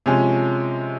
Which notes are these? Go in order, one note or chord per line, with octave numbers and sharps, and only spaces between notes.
C3 F3 G#3 C#4